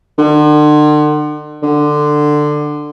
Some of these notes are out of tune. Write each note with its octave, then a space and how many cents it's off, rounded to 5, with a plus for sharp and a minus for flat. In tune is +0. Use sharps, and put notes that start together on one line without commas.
D3 +40
D3 +15